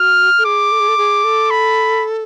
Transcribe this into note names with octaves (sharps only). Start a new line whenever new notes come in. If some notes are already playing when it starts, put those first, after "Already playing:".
Already playing: F#4 F6
A4
G#4 D6
A4
G#4
A4
G#4
A4
B5